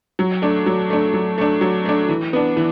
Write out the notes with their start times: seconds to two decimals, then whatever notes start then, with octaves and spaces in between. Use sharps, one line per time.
0.19 F#3
0.42 A3 D4
0.66 F#3
0.90 A3 D4
1.14 F#3
1.38 A3 D4
1.61 F#3
1.85 A3 D4
2.09 E3
2.33 B3 D4
2.57 E3